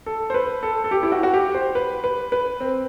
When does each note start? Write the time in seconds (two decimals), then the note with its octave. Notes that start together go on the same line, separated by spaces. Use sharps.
0.06 A4
0.30 C5
0.34 B4
0.63 A4
0.84 A4
0.91 G4
1.03 E4
1.12 F#4
1.23 F#4
1.34 G4
1.54 C5
1.75 B4
2.04 B4
2.32 B4
2.60 C4